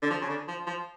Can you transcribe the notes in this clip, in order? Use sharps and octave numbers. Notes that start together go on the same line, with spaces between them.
D3
F3
C#3
D3
F3
F3